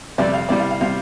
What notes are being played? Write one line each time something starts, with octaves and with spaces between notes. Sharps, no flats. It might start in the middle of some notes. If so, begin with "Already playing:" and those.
F2 C3 G3 D5
F5
C2 C3 G3 D5
F5
F5
C3 G3 F5